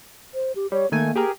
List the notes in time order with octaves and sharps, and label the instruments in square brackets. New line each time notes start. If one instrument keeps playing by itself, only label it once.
[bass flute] C5
G4
[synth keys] G3 [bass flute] C#5
[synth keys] D#3 A3 G#5 [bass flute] A#3
[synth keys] G4 G#4 A#4